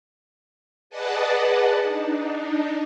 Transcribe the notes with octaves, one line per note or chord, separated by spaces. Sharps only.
G#4 B4 D5 D#5 F#5 A5
D4 D#4